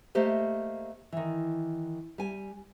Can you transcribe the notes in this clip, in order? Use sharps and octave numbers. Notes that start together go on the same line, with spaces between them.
A3 A#3 G4 C5 D#5
D#3 E3
G3 G#5